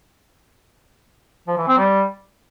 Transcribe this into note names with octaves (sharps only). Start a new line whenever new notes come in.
F3
E3
C4
G3